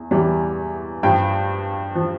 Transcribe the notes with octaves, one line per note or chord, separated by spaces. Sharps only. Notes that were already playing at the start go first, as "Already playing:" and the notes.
Already playing: E2
E2 E3 G3
G2 F3 G5
F3